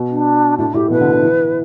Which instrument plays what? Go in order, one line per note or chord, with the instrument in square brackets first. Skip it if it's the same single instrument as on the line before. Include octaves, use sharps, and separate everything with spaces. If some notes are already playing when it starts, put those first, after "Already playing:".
Already playing: [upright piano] B2
[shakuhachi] D4
[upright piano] A2 [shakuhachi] D4
[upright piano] A2 [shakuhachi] G4
[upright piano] B2 [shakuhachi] B4
[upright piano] D3
D3
E3